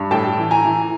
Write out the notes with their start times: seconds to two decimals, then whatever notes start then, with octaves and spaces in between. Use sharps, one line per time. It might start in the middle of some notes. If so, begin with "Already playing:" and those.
Already playing: G2
0.11 A2 G5 A5
0.38 E3
0.51 G#5 A#5
0.65 E3